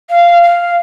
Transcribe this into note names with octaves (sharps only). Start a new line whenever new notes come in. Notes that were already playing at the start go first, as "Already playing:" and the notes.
F5
F5